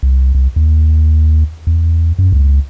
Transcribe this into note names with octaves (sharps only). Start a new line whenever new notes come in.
C2
C2
D#2
E2
F#2
C#2